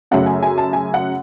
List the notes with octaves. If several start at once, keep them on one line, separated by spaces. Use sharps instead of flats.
F#2 C#3 F#3 A3 C#4 F#5
G#5
G#5
A5
G#5
F#5